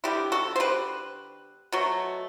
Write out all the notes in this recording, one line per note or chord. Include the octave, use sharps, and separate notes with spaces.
D3 G3 B3 E4 G4
F#4 A4
C5
G4 B4
B2 F#3 A3